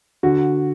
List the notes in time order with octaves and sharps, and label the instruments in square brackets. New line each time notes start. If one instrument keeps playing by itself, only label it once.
[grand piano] D3 F#4